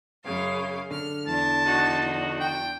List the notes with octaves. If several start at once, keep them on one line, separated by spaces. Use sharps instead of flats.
F#2 C#3 F5
D3 F6
E2 D4 A5
D#4 F#4
G5